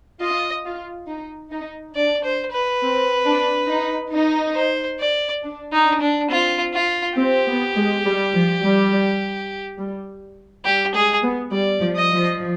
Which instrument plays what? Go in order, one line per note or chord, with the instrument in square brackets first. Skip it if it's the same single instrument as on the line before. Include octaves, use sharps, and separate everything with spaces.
[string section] F4 [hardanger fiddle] D#5
[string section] F4
D#4
D#4
[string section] D4 [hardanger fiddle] D5
[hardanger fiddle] C5
B4
[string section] C4
D4
D#4
D#4
[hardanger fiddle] C5
D5
[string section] D4
[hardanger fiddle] D#4
[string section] D4
[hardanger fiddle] D4
[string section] C4 [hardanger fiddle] F4
[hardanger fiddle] F4
[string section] C4 [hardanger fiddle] G4
[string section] B3
G#3
G3
F3
G3
G3
[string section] G3 [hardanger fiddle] G4
[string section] G#3 [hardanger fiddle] G#4
[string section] B3
[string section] G3 [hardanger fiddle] D5
[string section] F3
[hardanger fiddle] D#5
[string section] F3